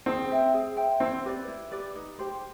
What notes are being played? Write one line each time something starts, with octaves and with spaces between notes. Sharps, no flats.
C4 G#4
C5 E5 G5
G#4
C5 E5 G5
C4 E4
G4 B4 D5
E4
G4 B4 D5
D#4
G4 C5